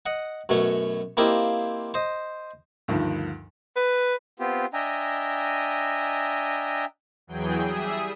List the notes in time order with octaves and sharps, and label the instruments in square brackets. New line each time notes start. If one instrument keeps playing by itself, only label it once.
[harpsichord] D#5 F#5
F#2 B2 A3 C#4
A#3 C4 E4 F4 G4 D#5
C5 D#5
[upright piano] D2 G2 D#3 F3
[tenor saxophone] B4
[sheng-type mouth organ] B3 C4 F4 G4
D4 D#5 E5 G5 G#5 A#5
[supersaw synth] E2 E3 F#3 G#4 G5 G6
G3 G#4 E5 D#6